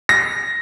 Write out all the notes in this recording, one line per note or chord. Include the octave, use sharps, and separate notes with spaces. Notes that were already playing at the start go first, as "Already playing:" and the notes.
A#6